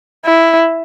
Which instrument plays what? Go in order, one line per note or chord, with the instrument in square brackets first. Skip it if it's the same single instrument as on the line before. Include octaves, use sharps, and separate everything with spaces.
[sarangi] E4